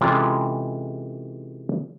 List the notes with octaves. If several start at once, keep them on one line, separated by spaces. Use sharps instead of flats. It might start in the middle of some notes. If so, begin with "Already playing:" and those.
C3 E3 G#3 C#4 F4 A4